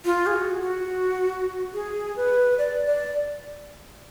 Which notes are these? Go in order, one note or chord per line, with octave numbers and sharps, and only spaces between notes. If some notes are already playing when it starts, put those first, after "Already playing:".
F4
G#4
F#4
F#4
G#4
B4
D5
D5